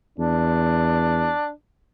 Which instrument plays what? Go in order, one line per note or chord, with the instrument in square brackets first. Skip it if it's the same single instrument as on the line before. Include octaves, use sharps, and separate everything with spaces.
[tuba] E2 [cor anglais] D4